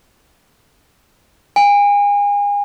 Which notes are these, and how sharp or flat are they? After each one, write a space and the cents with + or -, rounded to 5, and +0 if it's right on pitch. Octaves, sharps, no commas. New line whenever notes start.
G#5 -35